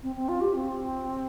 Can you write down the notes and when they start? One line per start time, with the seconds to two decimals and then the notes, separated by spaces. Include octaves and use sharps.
0.03 C4
0.16 C4
0.29 F4
0.41 G4
0.54 C4